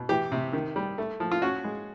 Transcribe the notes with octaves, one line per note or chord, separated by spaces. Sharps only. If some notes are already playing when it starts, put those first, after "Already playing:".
Already playing: B2
E3 G4
C3
D#3
G3
A3
F3
F4
C#4 F#4
G#3